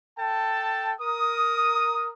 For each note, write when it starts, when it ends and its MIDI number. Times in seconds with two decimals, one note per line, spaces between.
0.19 0.93 69
0.19 0.93 79
0.19 0.93 81
1.00 2.12 70
1.00 2.12 87